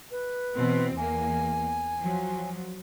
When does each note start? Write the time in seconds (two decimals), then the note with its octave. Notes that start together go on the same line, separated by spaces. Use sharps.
0.11 B4
0.55 B2 E3 C4
0.97 E2 A#3 G#5
1.99 F3 F#3